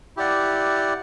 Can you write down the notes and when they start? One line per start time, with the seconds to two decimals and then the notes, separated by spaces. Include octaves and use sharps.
0.17 E4 G4 D5 F#5